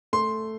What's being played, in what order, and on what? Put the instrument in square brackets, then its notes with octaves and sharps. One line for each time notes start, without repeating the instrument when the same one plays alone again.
[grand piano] A3 C6